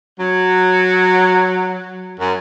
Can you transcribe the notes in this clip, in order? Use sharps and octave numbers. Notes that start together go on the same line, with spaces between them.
F#3
F#2